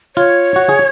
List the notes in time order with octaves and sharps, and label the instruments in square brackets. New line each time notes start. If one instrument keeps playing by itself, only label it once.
[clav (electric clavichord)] F4 [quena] C#5
[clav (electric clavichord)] F#4
G#4